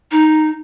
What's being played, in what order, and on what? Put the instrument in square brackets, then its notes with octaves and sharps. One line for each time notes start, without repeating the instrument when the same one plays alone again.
[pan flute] D#4